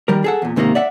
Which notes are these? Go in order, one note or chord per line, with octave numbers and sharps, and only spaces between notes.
D#3 G3 A#4
G#4 A4 F#5
E2 A#2
G#2 C3 D#3 G#3 A#3
D5 E5 F#5